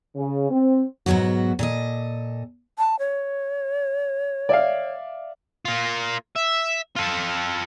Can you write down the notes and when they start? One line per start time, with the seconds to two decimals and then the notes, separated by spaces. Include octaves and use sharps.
0.15 C#3
0.50 C4
1.06 G#2 B2 F#3 B3 F#4
1.59 A#2 A4 D#5
2.78 A5
2.99 C#5
4.49 D5 E5 F5
5.65 A#3 F4
6.36 E5
6.96 F4 A4